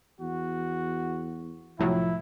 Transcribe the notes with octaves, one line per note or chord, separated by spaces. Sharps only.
E2 F#4
C2 A2 F3 F#3 E4